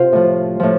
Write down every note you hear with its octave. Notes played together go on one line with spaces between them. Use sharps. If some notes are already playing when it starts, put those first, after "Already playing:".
Already playing: C3 F4 C5
A2 F3
A2 F3